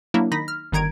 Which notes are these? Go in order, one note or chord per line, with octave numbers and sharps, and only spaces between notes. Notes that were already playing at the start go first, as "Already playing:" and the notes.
F#3 A#3 D4 E4
D#3 D#4 B5 A#6 B6
F6
G1 D#3 A#5 G#6 D7